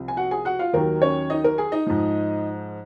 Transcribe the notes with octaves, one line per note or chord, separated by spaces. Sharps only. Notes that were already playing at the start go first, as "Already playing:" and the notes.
Already playing: C2 C3 F3
G#5
F#4 F#5
G#4 G#5
F#4 F#5
F4 F5
D#2 D#3 F#3 A#4
C#4 C#5
D#4 D#5
A#4
G#4 G#5
D#4 D#5
G#2 F3